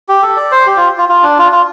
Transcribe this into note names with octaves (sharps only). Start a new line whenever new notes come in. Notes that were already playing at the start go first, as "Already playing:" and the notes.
G4
A4
D5
C5
G4
F4
F4
F4
D4
F4
F4